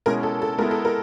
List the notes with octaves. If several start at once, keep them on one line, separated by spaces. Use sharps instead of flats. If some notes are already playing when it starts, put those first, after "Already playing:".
B2 G#3 C#4 E4 A#4
A4
A4
G#3 B3 E4 A#4
A4
A#4